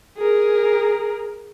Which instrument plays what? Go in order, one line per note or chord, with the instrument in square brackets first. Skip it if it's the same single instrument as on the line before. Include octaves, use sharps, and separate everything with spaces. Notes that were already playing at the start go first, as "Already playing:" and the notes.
[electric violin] G#4 A#4